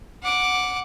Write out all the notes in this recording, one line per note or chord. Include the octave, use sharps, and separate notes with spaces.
F#5 D6